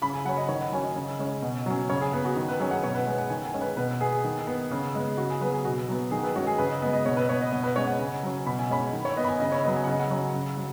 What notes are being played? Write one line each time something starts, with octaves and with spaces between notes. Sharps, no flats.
C#3 B5
G#5
F#3 C#4 F#5
D#5
D#3 C#5
F#5
F#3 C#4 G#5
D#5
C#3
G#3 C#4
B2
F#3 C#4
C#3 C#5
G#4
B3 G#4
F#4
D#3
B4
F#3 C#4 G#4
F#5
B2 C#5
B4
G#3 B3 G#5
F#5
D#3 G#5
G#5
G#3 C#4
B4
B2 B4
B3 G#4
D#3
B3
C#3
G#3 B3
C#3 F#4
G#4
F#3 B3 B4
G#4
B2 F#4
F#3 B3
D#3 G#4
B4
G#3 C#4 F#4
G#4
C#3 B4
D#5
G#3 B3 D#5
D#5
B2 C#5
B4
B3 C#5
D#5
B2 D#5
B4
G#3 C#4 C#5
F#5
C#3 G#5
F#3 C#4
B2 B5
G#5
G#3 C#4 B5
D#3
C#5
B3 D#5
B5
G#5
C#3 D#5
C#5
F#3 B3 D#5
G#5
F#5
C#3 D#5
F#5
F#3 C#4
C#3
F#3